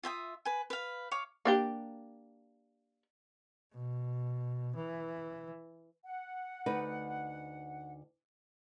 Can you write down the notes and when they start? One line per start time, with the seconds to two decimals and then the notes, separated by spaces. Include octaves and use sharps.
0.03 F4 E5 G5 D#6
0.45 B4 G#5
0.70 B4 F5
1.11 C#5 F5 D6
1.45 A#3 D4 G4
3.73 B2
4.76 E3
6.04 F#5
6.66 D2 D#4 B4